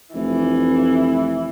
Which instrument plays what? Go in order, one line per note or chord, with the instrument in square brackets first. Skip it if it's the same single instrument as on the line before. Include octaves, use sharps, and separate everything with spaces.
[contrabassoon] F1 [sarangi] E3